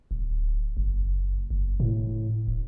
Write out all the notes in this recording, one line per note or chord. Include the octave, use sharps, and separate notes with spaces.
D1
F#1
F#1
A2
D1